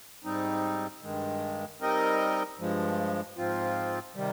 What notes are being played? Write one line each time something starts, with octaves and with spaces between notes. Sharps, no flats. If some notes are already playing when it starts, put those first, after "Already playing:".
G#2 G3 C4 D#4
G2 D#3 G#3
G3 C4 D#4 A#4 D#5
G2 F3 G#3
G#2 F3 C4 F4
C3 D#3 G3